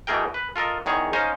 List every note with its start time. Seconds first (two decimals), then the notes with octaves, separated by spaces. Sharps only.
0.07 B2 E3 A3 G#4 A#4 G5
0.34 B4
0.56 F4 A4 A#4 D#5
0.86 E2 D#3 G#4 C#5
1.13 C#4 D#4 C5 D#5 F5